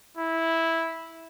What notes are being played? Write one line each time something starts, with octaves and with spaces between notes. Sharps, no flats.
E4